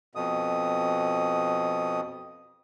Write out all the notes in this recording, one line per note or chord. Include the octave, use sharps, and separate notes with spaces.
F2 B2 D#6